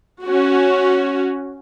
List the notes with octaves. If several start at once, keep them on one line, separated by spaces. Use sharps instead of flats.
C#4 F#4